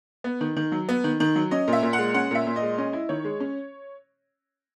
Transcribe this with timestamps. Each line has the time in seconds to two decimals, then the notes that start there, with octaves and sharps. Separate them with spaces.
0.24 B3
0.41 D#3
0.56 D#3
0.72 F#3
0.89 B3
1.04 D#3
1.20 D#3
1.35 F#3
1.51 C#4 D#5
1.68 A#2
1.73 E5
1.83 A#2
1.93 F#5
1.98 G#3
2.14 C#4 F#5
2.31 A#2 E5
2.47 A#2
2.56 D#5
2.62 G#3
2.78 C#4 D#5
2.93 E4
3.09 D#3 C#5
3.24 G#3
3.40 C#4